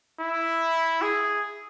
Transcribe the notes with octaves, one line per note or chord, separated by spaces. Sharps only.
E4
G#4